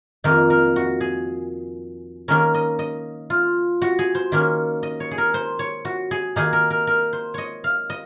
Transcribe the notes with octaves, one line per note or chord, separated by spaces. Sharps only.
F2 D#3 A#3 D#4 A#4
A#4
F#4
G#4
D#3 A#3 C#4 A#4
D#5
D#5
F4
F#4
G#4
C5
D#3 A#3 C#4
D#5
C#5
G#4
A#4
C5
C#5
F#4
G#4
D#3 A#3 D#4 G#4
A#4
A#4
A#4
C5
C#5 D#5
F5
D#5